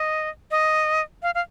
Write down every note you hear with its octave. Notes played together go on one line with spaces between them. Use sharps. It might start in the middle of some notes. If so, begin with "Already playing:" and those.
Already playing: D#5
D#5
F5
F5